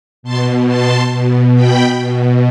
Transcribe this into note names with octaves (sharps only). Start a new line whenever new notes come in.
B2 A5 C6
A5 C6
B2
G5 B5
B2